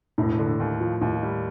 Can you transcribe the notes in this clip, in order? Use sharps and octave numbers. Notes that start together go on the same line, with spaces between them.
E1 A2
D3
D#2
F3
D#2 A2
G3